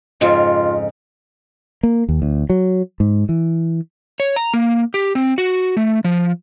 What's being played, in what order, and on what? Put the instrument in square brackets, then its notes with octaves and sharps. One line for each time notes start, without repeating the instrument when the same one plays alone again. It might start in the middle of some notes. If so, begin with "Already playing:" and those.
[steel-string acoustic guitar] F2 G#2 C#3 [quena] F4
[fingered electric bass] A#3
D#2
D2
F#3
G#2
E3
[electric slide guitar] C#5
A#5
A#3
G4
C4
F#4
A3
F3